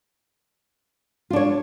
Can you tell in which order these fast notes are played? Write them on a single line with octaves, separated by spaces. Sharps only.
F4 D4 C#5